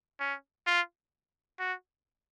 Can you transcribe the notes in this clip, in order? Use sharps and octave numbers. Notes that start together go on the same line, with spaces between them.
C#4
F4
F#4